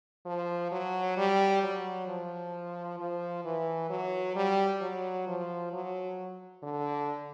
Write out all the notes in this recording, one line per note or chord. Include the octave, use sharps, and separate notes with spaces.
F3
F#3
G3
F#3
F3
F3
E3
F#3
G3
F#3
F3
F#3
D3